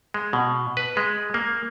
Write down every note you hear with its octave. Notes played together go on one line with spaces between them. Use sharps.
G#3
B2
B4
G#3
A#3